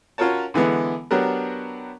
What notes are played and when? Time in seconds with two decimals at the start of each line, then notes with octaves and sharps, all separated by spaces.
0.18 C#4 F4 F#4 A#4 C#5 A5
0.54 D3 E3 G#3 B3
1.11 F#3 B3 D4 F#4 G4 A#4